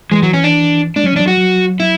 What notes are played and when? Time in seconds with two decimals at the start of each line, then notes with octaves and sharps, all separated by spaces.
0.12 E3 G#3
0.23 F#3
0.33 C#4
0.44 D4
0.96 G#3 D4
1.04 F#3 C#4
1.12 E3
1.16 D4
1.19 F#3
1.28 F#4
1.37 F#3
1.80 E4